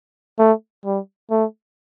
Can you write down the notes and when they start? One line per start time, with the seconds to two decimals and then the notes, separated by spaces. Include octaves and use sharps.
0.39 A3
0.85 G3
1.31 A3